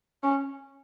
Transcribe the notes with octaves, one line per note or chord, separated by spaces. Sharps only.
C#4